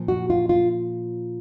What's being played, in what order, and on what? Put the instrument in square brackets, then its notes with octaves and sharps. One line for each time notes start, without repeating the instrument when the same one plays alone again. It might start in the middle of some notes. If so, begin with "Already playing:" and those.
Already playing: [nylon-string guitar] A#2 F3
F#4
F4
F4